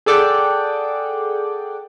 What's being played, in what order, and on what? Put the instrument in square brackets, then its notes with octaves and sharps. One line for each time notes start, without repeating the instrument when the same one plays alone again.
[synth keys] G#4 A4 D5 F#5 G5